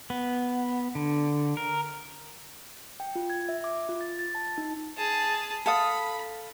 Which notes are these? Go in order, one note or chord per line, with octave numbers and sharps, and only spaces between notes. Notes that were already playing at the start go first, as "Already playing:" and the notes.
B3
D3
A#4
G5
F4
G#6
E5
D6
F4
A6
A6
A5
D#4
G#4 A5
A4 F5 B5 D#6